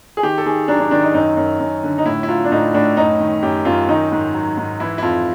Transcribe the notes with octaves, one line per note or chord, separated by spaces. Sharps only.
G#4
D#3 G4
A4
D#3 G#4
F#3 D4
D4
D#3 D4
D#4
F#2 D#4
F#2
F#2
D3
D#4
A2 E4
E4
F#3 F4
D4
A2 D#4
A2 D4
F#2 D#4
D#3
F#2 G4
F#2 F4
D#3 D#4
G#2
F#3
G#2
E3 E4
E4
F2 F4